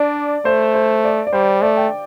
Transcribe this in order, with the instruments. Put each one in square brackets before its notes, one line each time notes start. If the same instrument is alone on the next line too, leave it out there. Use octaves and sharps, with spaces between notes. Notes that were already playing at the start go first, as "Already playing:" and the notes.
Already playing: [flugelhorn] D4 [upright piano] D5
[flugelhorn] A3 [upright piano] C5
[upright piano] C5
D5
D5
[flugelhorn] G3 [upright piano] C5
[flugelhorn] A3 [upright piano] D5
[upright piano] G5